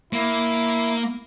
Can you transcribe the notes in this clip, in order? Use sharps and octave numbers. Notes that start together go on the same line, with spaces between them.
A#3 E4